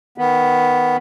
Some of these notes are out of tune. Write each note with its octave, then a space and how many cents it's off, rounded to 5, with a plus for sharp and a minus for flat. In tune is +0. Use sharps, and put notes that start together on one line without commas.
D#3 +0 B3 +0